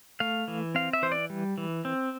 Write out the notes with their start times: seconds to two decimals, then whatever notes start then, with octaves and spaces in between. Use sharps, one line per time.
0.20 A3 F5
0.48 E3
0.75 C4 F5
0.93 E5
1.02 E3 C5
1.12 D5
1.30 G3
1.58 E3
1.85 C4